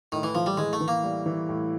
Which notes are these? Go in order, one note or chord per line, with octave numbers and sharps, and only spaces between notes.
A2 D#3
E3
E3 F3
G3
E3 G#3
A3
E3
A#3
G3
E3
A2